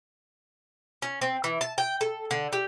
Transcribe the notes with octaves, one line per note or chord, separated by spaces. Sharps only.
C#4
C4
E3
A5
G5
A4
D3
G4